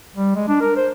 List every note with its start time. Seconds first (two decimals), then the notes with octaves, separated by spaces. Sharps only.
0.16 G3
0.35 G#3
0.48 D4
0.61 A#4
0.77 C5